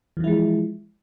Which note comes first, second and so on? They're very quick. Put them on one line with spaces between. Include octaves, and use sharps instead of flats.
E3 F3 E4 G#3